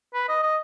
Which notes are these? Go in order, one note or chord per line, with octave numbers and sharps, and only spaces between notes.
B4
D#5
D#5